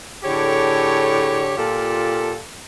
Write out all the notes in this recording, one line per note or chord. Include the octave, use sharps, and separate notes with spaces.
A2 D3 G4 G#4 C#5
A#2 F4 G4 A4